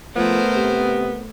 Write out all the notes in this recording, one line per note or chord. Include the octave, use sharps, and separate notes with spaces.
F3 A3 B3 A#4 C5
C3